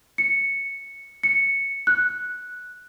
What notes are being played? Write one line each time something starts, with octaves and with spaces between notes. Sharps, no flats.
C#7
C#7
F#6